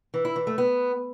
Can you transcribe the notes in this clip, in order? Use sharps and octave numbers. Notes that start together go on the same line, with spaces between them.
E3
E4
E3
A3
B3